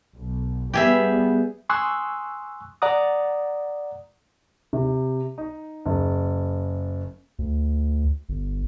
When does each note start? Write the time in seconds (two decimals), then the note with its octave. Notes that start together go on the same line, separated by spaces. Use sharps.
0.16 B1
0.74 G3 B3 G4 G#4 E5
1.70 G#5 C6 C#6 D#6 E6 F#6
2.82 D5 F#5 A#5 D6 D#6
4.73 C3
5.38 D#4
5.86 F#1
7.39 D2
8.29 G1